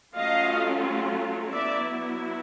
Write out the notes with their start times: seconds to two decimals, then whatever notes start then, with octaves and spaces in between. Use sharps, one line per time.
0.15 F#3 A3 C#4 F4 D#5 F5
1.52 F#3 B3 E4 D5 E5